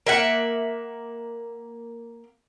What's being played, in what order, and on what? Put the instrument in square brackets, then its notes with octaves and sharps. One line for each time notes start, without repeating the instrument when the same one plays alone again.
[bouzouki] A#3 E5 F#5